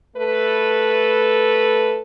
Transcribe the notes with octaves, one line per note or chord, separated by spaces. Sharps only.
A3 A4 B4